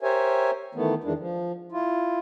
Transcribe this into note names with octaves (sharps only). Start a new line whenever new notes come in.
G4 A#4 C5 C#5 E5 G#5
D#3 E3 A3 B3
E2 D#3 E3 G#3 D4
F3
E4 F4